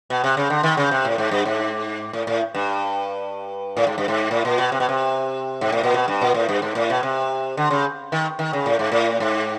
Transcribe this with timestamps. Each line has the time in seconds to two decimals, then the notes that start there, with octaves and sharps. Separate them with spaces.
0.10 B2
0.24 C3
0.37 C#3
0.50 D3
0.63 D#3
0.77 C#3
0.91 C3
1.05 A2
1.18 G#2
1.31 G2
1.45 G#2
2.13 A2
2.27 A2
2.55 G2
3.77 A2
3.87 G#2
3.98 G2
4.08 G#2
4.31 A2
4.45 A#2
4.58 B2
4.72 C3
4.80 B2
4.89 C3
5.61 G#2
5.72 A2
5.83 A#2
5.94 B2
6.08 G2
6.21 A#2
6.34 A2
6.49 G2
6.62 G#2
6.75 A2
6.90 B2
7.03 C3
7.57 D3
7.71 C#3
8.12 D#3
8.39 D#3
8.53 C#3
8.66 A2
8.79 G#2
8.92 A2
9.20 G#2